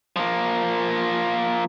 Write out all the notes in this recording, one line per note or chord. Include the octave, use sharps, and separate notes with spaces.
F3 A#3